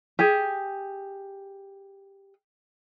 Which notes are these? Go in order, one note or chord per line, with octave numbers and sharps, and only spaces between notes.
G4 G#4